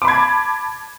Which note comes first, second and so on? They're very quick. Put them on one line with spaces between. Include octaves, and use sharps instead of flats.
D6 B5 G#6 A5